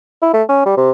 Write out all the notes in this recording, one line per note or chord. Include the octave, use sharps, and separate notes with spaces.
E4
A3
C#4
G3
C3